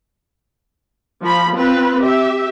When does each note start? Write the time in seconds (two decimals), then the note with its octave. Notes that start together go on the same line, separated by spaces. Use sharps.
1.23 F3 B5
1.55 C4 F4 B4
1.99 G4 E5